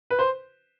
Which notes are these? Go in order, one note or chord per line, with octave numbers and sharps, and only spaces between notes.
B4
C5